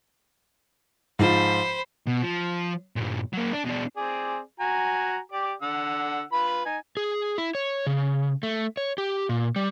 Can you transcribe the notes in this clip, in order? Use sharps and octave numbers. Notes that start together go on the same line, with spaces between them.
G#2 F3 F4 C5 B5
B2
F3
G2 A#2
F#3 A#3
D4
B2 D4
C4 G#4 D5
F#4 G#5 A#5
G4 D5 D6
D3 F#5 E6
F4 B4 B5
D#4 G#5
G#4
E4
C#5
C#3
A3
C#5
G4
A#2
G3